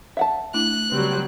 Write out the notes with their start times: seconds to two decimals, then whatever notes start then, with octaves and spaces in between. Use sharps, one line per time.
0.17 E5 F#5 A5
0.54 A3 D4 E4 F#6
0.92 C#3 F#3 G3 C4